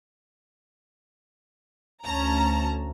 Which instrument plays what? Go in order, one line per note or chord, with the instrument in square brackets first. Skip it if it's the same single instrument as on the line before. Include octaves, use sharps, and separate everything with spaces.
[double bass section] D2 [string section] C#4 A5 A#5